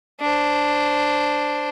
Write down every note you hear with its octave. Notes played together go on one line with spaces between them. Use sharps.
D4 C5